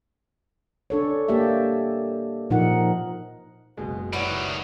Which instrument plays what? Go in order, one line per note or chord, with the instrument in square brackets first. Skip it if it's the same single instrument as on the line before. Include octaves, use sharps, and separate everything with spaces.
[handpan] D4 A4 C#5
A#3 G4 D5 E5
A#2 F3 D#4 A#4 F#5
[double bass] F#1 C#2 [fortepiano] B2 G#3
[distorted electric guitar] D#3 G3 [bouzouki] E4 F#4 [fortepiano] B4 C#5 D#5